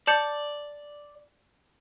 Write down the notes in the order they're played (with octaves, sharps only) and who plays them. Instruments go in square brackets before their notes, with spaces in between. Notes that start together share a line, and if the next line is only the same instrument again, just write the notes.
[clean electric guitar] D5 [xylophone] A5 G6 C#7